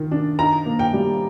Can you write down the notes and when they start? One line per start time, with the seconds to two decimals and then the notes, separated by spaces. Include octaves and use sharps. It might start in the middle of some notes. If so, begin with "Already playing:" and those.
Already playing: D#3 F4
0.11 D4
0.38 D#4 A#5
0.66 A#3
0.79 G5
0.93 G3